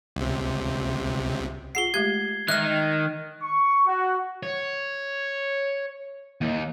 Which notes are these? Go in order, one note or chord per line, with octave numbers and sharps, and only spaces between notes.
C#2 C3
F4 G#4 F#5 C7 G7
G#3 A3 G4 G#6
D#3 G#3 D#4 E5 F6 F#6
C#6
F#4
C#5
D#2